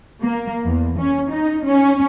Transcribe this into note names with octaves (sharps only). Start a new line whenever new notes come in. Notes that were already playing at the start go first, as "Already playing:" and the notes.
A#3
E2
C#4
D#4
C#4